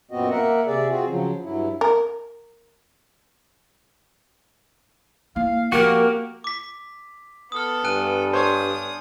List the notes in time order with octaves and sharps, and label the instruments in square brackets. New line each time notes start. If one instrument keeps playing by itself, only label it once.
[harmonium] F#2 A#2 B3 C4 F#4 D#5
A#3 A#4 E5 F#5
C3 G#4 D5 E5
C4 F4 F#4 G#4
C#3 F3 F#3
G2 F#3 E4
[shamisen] A#4
[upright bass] A#3 E4 [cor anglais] F5
[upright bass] F3 C4 [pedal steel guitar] A#3 F#4 [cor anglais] G4 [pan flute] A#4
[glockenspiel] D6 B6
[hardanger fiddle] B3 A4 [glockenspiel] D#6 F6
[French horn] G2 [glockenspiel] G#5 F#6 D#7
[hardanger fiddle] D4 D#6 [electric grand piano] C5 C#5 C6